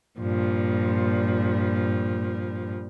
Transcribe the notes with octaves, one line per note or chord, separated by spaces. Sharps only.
G2 A#2 F3